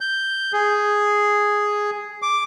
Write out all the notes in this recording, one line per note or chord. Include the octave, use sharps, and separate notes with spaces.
G6
G#4
D6